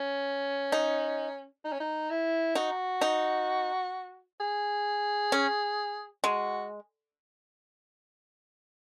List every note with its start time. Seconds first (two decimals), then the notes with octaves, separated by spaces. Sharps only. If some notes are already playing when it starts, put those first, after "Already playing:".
Already playing: C#4
0.72 D#4
1.64 D#4
1.72 C#4
1.80 D#4
2.10 E4
2.55 D#4 F#4
3.01 D#4
4.40 G#4
5.32 C#4
6.24 G#3 F#4